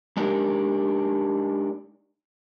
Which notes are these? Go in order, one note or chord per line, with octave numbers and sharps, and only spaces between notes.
G#3 D4 D#4 G4 A#4